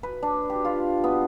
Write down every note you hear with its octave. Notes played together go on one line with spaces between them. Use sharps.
B4
D4
G4
F4
B3